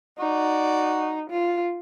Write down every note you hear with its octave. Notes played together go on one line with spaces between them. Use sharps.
D#4 F#4 D5
F4